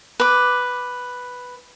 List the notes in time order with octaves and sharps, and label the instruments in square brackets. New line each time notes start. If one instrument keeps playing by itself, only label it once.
[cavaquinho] B4 D6